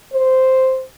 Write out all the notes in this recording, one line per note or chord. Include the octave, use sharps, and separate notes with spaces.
C5